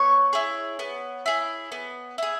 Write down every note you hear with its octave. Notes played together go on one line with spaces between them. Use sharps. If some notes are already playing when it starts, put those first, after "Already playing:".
Already playing: B3 C#5 C#6
E4 G#4
B3
E4 G#4
B3
E4 G#4